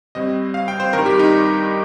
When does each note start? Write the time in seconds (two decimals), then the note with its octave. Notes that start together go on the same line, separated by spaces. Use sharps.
0.15 G2 G3 C4 D#5
0.54 F5
0.68 G5
0.80 C5
0.93 G2 D#3 G3 A#4
1.06 G4
1.19 D#4